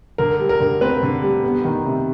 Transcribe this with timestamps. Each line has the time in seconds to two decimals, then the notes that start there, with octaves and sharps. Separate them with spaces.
0.18 D3 A#4
0.40 G3
0.49 A#4
0.60 D3
0.81 C4 B4
1.02 D3
1.22 G3
1.44 B3
1.65 D#3
1.85 C3